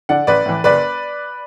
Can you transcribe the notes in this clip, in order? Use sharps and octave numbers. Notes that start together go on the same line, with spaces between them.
D3 D5 F#5
A1 B4 D5
A2 E3
F#1 B4 D5